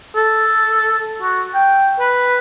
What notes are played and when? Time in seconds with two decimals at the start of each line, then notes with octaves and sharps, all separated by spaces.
0.15 A4
1.22 F#4
1.54 G5
2.00 B4